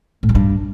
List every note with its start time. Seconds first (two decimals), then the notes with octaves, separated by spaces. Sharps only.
0.23 A2
0.29 G#3
0.35 G2